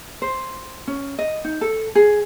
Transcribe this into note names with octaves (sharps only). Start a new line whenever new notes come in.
C5
C#4
D#5
D#4
A4
G#4